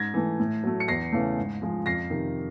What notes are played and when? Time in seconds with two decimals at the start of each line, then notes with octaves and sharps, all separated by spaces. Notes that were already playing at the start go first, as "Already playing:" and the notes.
Already playing: G#2 G#6 A#6
0.14 E3 A3
0.40 A2
0.63 F#3 A3
0.80 C#7
0.88 E2 A#6 C7
1.12 C#3 E3 A3
1.38 G#2
1.62 F3 G#3
1.86 F2 A#6 C7
2.10 C3 D#3